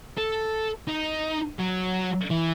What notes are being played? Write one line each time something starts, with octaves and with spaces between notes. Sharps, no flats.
A4
D#4
F#3
E3